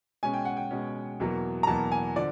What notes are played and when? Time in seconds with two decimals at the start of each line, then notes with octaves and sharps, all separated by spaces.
0.23 B2 G#3 C#4 G#5
0.34 G5
0.45 F#5
0.57 G5
0.71 B2 G#3 C#4
1.20 E2 B2 F#3 A#3
1.63 A#5
1.67 E2 B2 F#3 A#3 A5
1.92 G#5
2.16 D3 F3 D5